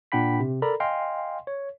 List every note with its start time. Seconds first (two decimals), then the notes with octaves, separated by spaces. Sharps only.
0.12 A#2 D4 F#5 G5 B5 B6
0.40 C3
0.62 A4 A#4 D5 A#5 B5
0.80 D#5 F5 G5 G#5 C6
1.47 C#5